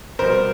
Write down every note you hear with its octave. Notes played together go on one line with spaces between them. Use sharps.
B2 G3 A#4 C5